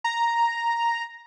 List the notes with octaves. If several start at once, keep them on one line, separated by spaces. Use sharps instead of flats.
A#5